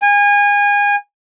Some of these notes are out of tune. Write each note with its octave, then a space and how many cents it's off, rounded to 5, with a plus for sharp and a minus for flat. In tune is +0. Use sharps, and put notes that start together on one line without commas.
G#5 -30